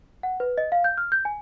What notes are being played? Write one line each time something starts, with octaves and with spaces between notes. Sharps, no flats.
F#5
B4
D#5
F5
G6
F6
G6
G#5